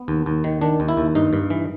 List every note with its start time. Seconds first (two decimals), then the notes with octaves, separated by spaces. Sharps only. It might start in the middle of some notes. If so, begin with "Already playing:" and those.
Already playing: B3
0.08 D#2
0.26 D#2
0.44 D#3
0.61 D#3 D4
0.80 D#2
0.88 E4
0.97 D#2
1.15 G2 D#4
1.33 G2
1.50 E3